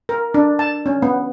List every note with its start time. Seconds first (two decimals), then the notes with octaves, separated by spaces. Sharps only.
0.09 A#4
0.34 D4
0.59 A5
0.86 C#4
1.02 B3